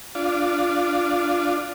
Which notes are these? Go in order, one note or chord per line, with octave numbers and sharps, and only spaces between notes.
D4 F4